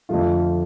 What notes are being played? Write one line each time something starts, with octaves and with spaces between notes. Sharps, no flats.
F2 D3 F3 A3 F4